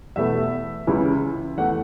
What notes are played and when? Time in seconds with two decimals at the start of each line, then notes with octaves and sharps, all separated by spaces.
0.16 E2 B2 A3 E5
0.87 C#2 C#3 E3 C#4
1.57 E2 E3 A3 F#5